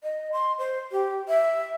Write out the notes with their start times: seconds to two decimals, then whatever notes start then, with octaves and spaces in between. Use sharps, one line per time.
0.04 D#5
0.33 C6
0.59 C5
0.92 G4
1.28 E5